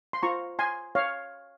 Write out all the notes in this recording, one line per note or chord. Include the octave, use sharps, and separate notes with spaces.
C6
F4 C5 A#5 C#6
G#5 C6
C#5 F5